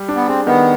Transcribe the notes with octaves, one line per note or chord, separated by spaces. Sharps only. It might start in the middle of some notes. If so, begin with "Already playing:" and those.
Already playing: G3
D4
B3
C4 G#4
D#3 B3